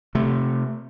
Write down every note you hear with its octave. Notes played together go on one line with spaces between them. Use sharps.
C3 A3